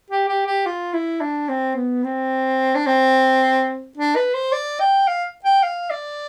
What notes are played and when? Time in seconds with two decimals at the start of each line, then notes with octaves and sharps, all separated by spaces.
0.10 G4
0.28 G4
0.46 G4
0.66 F4
0.94 E4
1.21 D4
1.49 C4
1.76 B3
2.04 C4
2.75 D4
2.87 C4
3.97 D4
4.16 B4
4.34 C5
4.52 D5
4.80 G5
5.08 F5
5.45 G5
5.63 F5
5.90 D5